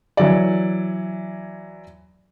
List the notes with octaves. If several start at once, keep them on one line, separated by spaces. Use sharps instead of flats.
E3 F#3 D5